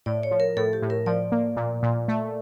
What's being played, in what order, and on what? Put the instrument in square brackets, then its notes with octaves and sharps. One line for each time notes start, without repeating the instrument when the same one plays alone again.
[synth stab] A2 [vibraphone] D5
[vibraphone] C#5
[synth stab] F3
[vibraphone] A#4
[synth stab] A2 [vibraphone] A4
[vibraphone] G4
[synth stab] A2
[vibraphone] A#4
[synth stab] F3 [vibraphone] D5
[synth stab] A#3
A#2
A#2
A3